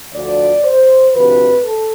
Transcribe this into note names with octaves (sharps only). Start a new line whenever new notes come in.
D2 D3 F3 D5
C5
D2 C3 F3 B4
A4